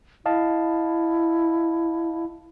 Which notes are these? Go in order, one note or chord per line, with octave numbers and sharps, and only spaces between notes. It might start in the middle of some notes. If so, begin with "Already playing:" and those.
E4 D#5 F5 A5